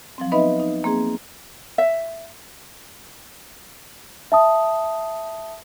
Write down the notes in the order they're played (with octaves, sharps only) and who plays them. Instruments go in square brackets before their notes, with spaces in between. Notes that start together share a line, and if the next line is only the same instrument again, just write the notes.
[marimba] F3 F#3 C4
B3 D#4 B4 D#5 E5 B5
D#4
A#3 C4 G#4
[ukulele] E5
[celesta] E5 A5 D#6